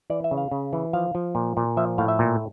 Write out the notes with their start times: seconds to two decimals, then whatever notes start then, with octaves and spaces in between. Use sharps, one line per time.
0.10 E3 D5
0.24 E5
0.31 C#3
0.37 F5
0.51 C#3
0.73 E3
0.93 F3 F5
1.15 F3
1.35 A#2
1.57 A#2
1.77 F3 E5
1.98 A2 F5
2.08 E5
2.19 A#2